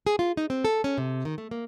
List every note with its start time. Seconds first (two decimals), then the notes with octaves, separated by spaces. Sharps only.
0.07 G#4
0.19 F4
0.37 D#4
0.50 C4
0.65 A4
0.84 C#4
0.98 C3
1.25 D#3
1.38 A3
1.51 A#3